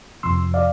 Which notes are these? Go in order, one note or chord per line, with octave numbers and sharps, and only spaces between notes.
F2 C3 F3 C6 E6
D5 F5